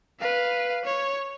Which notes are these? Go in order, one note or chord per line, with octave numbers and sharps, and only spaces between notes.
B4 F5
C#5